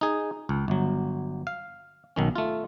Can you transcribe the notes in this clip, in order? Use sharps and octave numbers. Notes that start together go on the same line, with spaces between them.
D#4 G#4
C#2
G1 F#3
F5
B1 D#3 C#4
A3 F4